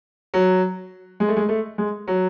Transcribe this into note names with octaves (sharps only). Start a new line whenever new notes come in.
F#3
G#3
A3
G#3
A3
G#3
F#3